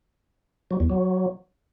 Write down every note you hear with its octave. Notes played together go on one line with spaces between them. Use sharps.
F#3
E2
F#3